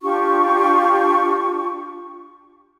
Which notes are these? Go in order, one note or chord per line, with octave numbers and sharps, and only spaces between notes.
D4 F4 G4 C#6